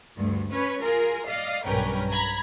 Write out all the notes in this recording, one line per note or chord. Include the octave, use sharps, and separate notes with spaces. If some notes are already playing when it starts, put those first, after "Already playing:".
D2 G2
C#4 B4 C#5
F4 G#4 A#4
D5 D#5 F5
B1 G2 C#4 A#4 B4 G5
A#5 B5 G#6